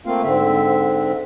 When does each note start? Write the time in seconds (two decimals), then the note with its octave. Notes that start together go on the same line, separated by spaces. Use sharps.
0.06 A3 A#3 C4 F4 F5
0.23 G#2 D3 C4 E5